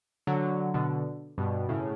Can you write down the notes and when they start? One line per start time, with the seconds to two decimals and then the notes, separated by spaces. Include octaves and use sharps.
0.27 D3 F#3
0.74 B2 D3
1.38 G2 B2
1.69 A2 C#3